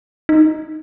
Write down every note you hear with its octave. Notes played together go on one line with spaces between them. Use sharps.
D#4